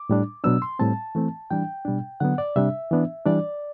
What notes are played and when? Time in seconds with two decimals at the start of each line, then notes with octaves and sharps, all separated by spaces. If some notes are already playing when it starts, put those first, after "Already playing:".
Already playing: D6
0.09 A2 G3 D4
0.44 B2 F#3 B3 D4 E6
0.62 C6
0.79 A2 G3 C4 A5
1.15 E3 A3 C4
1.50 E3 G3 D4 G5
1.85 B2 G3 D4
2.20 D3 F#3 B3 F#5
2.38 D5
2.56 C3 G3 D4 E5
2.91 E3 B3 D4
3.26 E3 G3 D4 D5